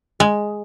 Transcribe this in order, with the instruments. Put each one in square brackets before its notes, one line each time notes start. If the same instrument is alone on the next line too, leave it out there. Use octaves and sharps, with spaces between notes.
[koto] G#3